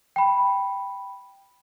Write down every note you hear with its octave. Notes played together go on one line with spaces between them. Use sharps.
G5 B5